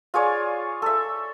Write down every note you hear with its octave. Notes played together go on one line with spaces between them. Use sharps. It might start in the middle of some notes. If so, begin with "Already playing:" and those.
F4 G#4 C#5 D5
A4 E5